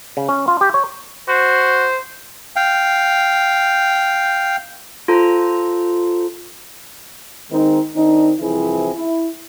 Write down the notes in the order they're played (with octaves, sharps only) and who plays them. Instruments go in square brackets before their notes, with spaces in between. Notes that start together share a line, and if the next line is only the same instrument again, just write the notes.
[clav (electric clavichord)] C#3
C#4
F4
G4
C#5
[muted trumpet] F#4 [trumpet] C5
[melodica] F5 G5
[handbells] F4 A4 C5 A#5
[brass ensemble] D#3 G#3 C4 D#4
D#3 C4 D4 D#4
C2 E3 F3 C4 E4 G#4
E4